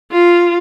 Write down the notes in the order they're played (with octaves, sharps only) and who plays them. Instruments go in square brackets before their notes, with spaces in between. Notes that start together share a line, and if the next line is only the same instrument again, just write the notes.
[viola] F4